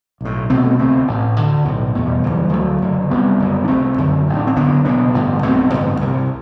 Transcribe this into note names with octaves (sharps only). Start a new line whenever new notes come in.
B1 A2
C2 B2 A3 C4
A3 C4
D2 C3 A3 C4
A1 A2
D2 D3
B1 A2
E1 E2 B2 A3
G3
F#3
F#1 E2 C3
E3 G3
D2 D3 F#3 A3
F#1 F#2 D3
C2 C3 G3 B3
F#1 F#2 D3
D4
C2 C3 A3 C4
F#1 F#2 D3
A1 A2
D4
C4
F#1 F#2 D3 B3 D4
F#1 E2 B2 B3 D4
A1 G2 D3
B1 B2 A3 C4
A1 G2 D3
C2 C3